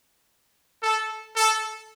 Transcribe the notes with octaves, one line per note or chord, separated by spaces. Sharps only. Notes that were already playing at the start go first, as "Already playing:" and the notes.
A4
A4